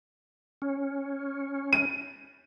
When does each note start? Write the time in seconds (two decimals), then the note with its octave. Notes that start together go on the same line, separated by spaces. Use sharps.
0.62 C#4
1.73 D#7